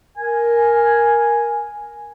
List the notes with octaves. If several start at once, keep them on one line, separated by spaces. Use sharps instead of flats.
A#4 G#5